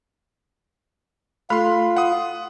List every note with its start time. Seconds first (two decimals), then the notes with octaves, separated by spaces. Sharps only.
1.50 A3 F4 A4 B5 C6
1.97 F#5 D#6